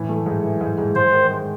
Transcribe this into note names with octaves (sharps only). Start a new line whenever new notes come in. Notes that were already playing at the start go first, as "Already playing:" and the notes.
Already playing: A2 E3
A3
G#2
E3
G#2
G#2
G#2 C5
D#3
G#3